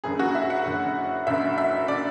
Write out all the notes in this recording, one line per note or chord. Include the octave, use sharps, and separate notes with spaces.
F#1 F#2 D3 G#4
F#4
E5
F#5
F#1 F#2 D3
F#1 F#2 D3 E5
E5
D3 D5